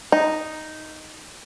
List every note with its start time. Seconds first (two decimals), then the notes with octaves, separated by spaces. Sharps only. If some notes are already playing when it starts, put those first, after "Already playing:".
0.12 D#4